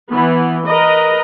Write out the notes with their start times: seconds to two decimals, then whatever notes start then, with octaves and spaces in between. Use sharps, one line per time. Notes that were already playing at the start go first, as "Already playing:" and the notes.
0.10 E3 B3
0.66 A#4 B4 D#5